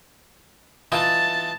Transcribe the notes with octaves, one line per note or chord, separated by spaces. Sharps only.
E3 D#4 F4 A5 A6